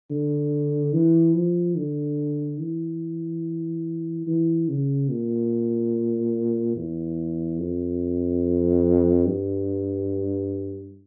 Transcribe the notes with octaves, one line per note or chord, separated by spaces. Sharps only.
D3
E3
F3
D3
E3
E3
C#3
A#2
E2
F2
G2